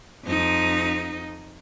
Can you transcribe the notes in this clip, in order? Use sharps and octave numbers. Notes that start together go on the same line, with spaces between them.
F2 D#4